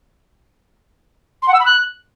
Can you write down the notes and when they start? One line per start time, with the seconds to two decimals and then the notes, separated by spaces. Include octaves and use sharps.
1.42 C6
1.48 F#5
1.54 E6
1.59 B5
1.65 F#6